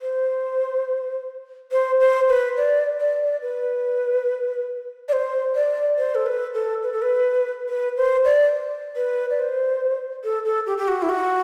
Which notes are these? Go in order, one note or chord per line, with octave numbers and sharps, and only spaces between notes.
C5
C5
C5
B4
D5
D5
D5
B4
D5
C5
D5
C5
A4
B4
A4
B4
A4
B4
B4
C5
D5
B4
D5
C5
A4
A4
G4
G4
F#4
E4
F#4